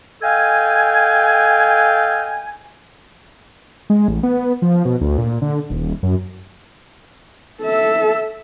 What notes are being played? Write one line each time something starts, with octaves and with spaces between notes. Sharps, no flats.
A4 D#5 F5 G5 G#5
G#3
A1
B3
F3
B2
D2
A#2
D3
D#1
F#2
A4 E5